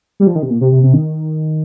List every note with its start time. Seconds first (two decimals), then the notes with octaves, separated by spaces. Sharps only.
0.20 G3
0.27 F3
0.35 D#3
0.43 C3
0.50 A#2
0.61 C3
0.72 C3
0.83 C3
0.94 D#3